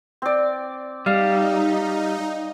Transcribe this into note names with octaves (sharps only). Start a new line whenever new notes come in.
C4 D5
G3 D#4 F5